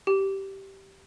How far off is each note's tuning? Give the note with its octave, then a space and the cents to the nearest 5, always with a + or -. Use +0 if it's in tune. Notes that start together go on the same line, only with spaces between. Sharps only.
G4 -15